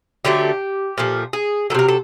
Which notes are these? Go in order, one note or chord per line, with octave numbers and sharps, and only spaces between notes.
D3 F#3 A3 G4
A#2 F3 A3
G#4
C3 D#3 F#3 A4 A#4
A4